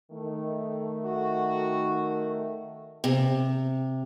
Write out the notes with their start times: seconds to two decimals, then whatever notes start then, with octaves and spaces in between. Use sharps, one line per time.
0.11 D#3 A3
1.04 F#4
3.04 C3